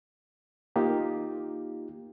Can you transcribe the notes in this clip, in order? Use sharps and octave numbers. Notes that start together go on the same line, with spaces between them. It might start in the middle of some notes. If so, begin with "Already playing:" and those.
A#3 D#4 F4 G4